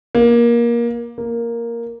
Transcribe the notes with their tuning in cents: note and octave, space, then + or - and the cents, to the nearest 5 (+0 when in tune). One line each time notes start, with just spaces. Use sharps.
A#3 +20
A#3 +0